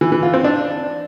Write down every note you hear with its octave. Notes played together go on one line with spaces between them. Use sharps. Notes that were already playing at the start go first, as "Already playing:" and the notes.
E3
E3
F4
C4
D4